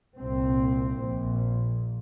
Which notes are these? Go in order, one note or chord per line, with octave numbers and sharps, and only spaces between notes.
C2 A#2 C4
A#1 A#2